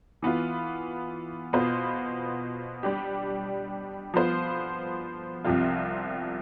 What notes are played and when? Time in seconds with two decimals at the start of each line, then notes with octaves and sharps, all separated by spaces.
0.22 E3 B3 F4
1.53 B2 B3 F4 C5
2.83 G3 D4 G4
4.14 F3 B3 F4 C5
5.44 C2 C3 F3 C4 F4